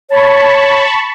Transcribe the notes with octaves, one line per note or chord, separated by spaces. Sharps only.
C#5 A5 B5 C#6